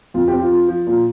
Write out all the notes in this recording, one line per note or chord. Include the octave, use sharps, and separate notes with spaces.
F2 F4
G4
C4
F4
F3
F3
A#2